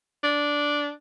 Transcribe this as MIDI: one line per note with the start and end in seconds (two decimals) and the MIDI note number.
0.24 0.91 62